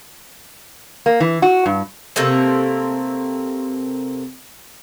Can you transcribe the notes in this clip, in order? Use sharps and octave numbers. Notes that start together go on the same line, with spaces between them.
A#3
E3
F#4
G2
C3 A3 A#3 C4